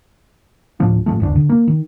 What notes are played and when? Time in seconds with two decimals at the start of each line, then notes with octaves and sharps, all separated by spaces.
0.80 D1 A2 F3 D4
1.06 A1 C#3 F3 A3
1.20 F#1 D2 D4
1.36 D3
1.49 A#3
1.68 D#3